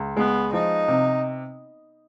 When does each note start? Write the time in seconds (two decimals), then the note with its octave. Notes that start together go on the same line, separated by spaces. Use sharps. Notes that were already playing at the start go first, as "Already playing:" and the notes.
Already playing: C#2
0.17 G#3 B3
0.53 F3 D#4
0.88 C3